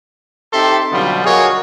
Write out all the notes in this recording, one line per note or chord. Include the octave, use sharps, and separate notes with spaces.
C4 D#4 G4 A4 E5 C6
B2 D3 F#3 G3 B3 F4
F#4 G#4 A#4 C#5 D#5 F5